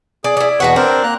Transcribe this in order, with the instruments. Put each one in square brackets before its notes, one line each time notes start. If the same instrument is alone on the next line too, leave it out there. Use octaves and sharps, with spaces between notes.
[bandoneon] G#4 [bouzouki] D5
[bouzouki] E4 D5
[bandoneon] E2 B2 C#6 [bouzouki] F#4 B4 F#5
[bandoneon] C4 A#4 C5 [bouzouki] D4
[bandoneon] A#3 A#5 F#6